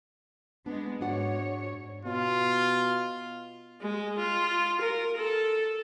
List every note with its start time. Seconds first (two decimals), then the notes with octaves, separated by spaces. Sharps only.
0.66 G#3 B3 D4
1.01 G#2 D4 F#4 C#5 F#5
2.05 B2 F4
3.82 G#3
4.19 F4
4.81 A#4
5.17 A4